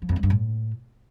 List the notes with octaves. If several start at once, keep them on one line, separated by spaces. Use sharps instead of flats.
F3
F2
G3
G2
A2